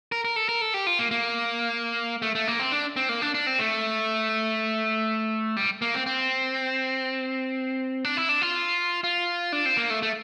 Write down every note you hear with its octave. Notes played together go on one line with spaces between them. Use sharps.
A#4
A#4
A4
A#4
A4
G4
F4
A#3
A#3
A3
A3
A#3
C4
D4
C4
A#3
D4
D4
C4
A3
G3
A#3
C4
C4
D4
E4
D4
F4
F4
D4
C4
A#3
A3
A3